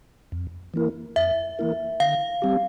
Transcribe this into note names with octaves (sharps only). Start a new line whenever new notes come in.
F2
E3 A#3 E4 A#4
F2 E5
E3 A#3 E4 A#4
D3 F5
G3 C4 G4